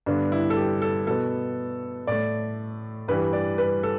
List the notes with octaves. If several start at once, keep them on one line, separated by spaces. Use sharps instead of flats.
G2 D3 B3 D4
E4
A4
G4
A4
B2 B3 A4
A2 A3 D5
G2 E3 G3 B4
D5
B4
A4